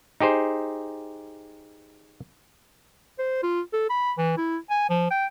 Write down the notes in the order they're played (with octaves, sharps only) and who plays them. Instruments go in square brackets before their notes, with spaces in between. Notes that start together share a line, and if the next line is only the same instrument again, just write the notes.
[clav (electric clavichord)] D#4 G4 G#4 C5
[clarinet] C5
F4
A4
B5
E3
E4
G#5
F3
G5